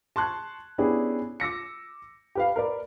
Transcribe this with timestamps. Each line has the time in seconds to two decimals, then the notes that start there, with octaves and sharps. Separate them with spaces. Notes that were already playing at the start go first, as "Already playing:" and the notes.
0.16 A5 C6 C#6 F#6 G#6
0.78 B3 C#4 D4 E4 G4 G#4
1.40 D6 E6 A#6 C#7
2.35 G4 B4 F5
2.56 A#4 B4 D5